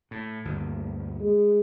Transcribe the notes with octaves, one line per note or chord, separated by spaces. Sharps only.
A2
D2 G2 A#3
G#3